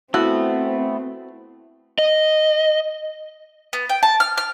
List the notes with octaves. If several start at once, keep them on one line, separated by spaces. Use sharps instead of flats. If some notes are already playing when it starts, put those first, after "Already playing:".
A3 B3 C4 E4 F#4
D#5
B3
G5
A5
F6
F6